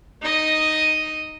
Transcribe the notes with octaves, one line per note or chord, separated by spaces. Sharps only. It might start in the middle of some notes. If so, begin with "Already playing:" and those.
D#4 D#5 D#6